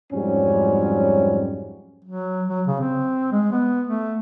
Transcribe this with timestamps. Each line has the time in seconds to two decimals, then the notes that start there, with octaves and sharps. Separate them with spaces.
0.13 F2 G#2 F#3 G3 C#4
2.05 F#3
2.48 F#3
2.67 C#3
2.80 C4
3.32 G#3
3.52 B3
3.87 A3